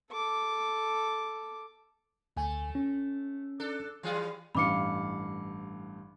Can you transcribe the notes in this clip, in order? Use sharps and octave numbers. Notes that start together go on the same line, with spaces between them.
A4 D6
D2 A3 G#5
C#4
D4 A4
E3 G3 G#4
A1 G2 F5 B5 D6 C#7